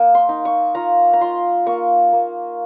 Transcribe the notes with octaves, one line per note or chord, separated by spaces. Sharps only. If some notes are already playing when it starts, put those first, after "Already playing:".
Already playing: A#3 D#4
C6
D#4
C#6
F4 A#5
A#5
F4 C6
A#3 C#6
A#3